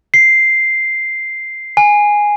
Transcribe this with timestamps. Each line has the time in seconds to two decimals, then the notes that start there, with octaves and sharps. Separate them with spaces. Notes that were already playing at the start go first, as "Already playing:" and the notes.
0.14 C7
1.77 G#5